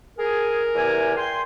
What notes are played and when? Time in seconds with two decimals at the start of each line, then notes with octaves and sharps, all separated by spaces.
0.19 G#4 A#4
0.75 E2 C3 G#5
1.16 G5 G#5 C6